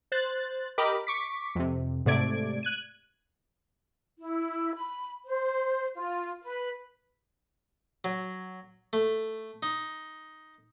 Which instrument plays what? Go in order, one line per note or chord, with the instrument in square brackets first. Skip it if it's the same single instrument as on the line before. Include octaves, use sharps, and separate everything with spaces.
[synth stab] C5 F#6 A6
G4 A#4 D#5 B5 D6
C#6 D6 B6
F2 C3
G#2 C3 A3 D5 G#6 D7
F#6 G#6 D#7
[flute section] E4
B5
C5
F4
B4
[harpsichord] F#3
A3
D#4